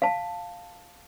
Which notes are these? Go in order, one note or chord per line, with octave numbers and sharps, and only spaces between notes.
F5 A5